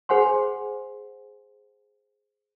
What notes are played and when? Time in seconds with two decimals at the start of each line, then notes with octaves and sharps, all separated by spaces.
0.09 G#4 C5 F#5 G#5 C6